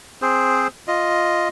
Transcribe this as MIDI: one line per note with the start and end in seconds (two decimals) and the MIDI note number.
0.22 0.68 60
0.22 0.68 68
0.22 0.68 72
0.88 1.49 65
0.88 1.49 75